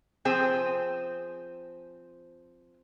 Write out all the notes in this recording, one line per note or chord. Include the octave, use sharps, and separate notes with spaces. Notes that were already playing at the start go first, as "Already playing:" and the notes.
F3 C4 G#4